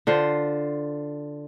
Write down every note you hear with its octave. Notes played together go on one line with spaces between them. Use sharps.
D3 F4 C5